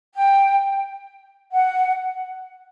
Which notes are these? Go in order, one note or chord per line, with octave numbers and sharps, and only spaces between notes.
G5
F#5